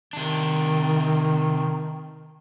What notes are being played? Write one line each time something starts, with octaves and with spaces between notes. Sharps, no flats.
C3 D#3 D4